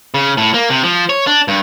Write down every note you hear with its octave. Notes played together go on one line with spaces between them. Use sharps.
C#3
A2
A#3
C3
F3
C#5
D4
G2